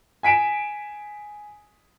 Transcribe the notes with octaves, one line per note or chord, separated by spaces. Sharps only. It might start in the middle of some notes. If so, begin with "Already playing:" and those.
G#5 B6 D7 E7